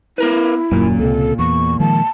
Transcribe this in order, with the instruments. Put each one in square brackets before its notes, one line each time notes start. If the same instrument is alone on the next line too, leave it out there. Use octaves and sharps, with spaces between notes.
[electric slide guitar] B3 A#4 B4 [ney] E4
[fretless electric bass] D#1 F#2 [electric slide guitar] A#2 A#3
[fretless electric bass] C#2 C3 [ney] A4
[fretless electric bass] E2 [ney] C#6
[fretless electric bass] D#3 F3 G#3 [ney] A5